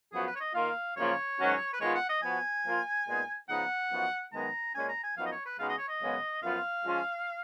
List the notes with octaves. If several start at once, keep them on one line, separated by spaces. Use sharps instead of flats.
F#2 F3 B3 F#4 G#4
B4
C#5
D#5
D#3 A#3 F4 F5
F#2 C#3 F3 A#3 F4 C#5
G#2 D#3 F#3 C#4 F#4
B4
D#3 G#3 B3 F4 C#5
F#5
D#5
F3 B3 F#4 G#5
F3 A#3 F4
A#2 G#3 B3 D#4
C#3 F3 B3 D#4 F#5
F#2 F3 B3 D#4 F#4
F#2 D#3 G#3 B3 A#5
A#2 G#3 C#4 G#5
A#5
G#5
F#2 F3 B3 D#4 F#4 F5
D#5
C#5
B4
C#3 G#3 B3 D#4 F#4 F5
D#5
C#5
D#5
F#2 C#3 G#3 B3
F#2 F3 B3 F4 F5
F3 G#3 C#4 F4